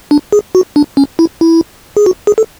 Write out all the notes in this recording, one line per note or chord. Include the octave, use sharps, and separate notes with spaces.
D4
G#4
F#4
D4
C#4
E4
E4
G#4
F#4
G#4
A4